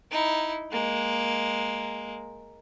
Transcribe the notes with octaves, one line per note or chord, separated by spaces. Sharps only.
D#4 E4
G#3 A#3